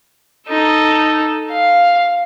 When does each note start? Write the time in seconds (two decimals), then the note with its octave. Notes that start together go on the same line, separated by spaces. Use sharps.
0.48 D#4 A4
1.51 F5